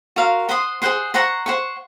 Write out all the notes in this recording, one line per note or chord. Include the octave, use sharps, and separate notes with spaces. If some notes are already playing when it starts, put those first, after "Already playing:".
F#4 A#4 F5 C6
C5 F#5 C6 D#6
G#4 C5 F#5 C6
C5 F#5 A#5 C#6
C5 F#5 C#6